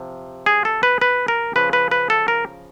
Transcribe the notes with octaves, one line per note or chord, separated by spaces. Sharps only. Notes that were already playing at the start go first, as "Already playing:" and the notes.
Already playing: C3 F3
G#4
A4
B4
B4
A#4
C#3 F3 B4
B4
B4
A4
A#4